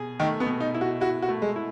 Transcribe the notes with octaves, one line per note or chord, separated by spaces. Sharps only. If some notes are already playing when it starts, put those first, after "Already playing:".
Already playing: B2 G#4
D#3 A3
B3
B2
D#4
E4
F#4
E4 F#4
F#4
A3
G#3
E4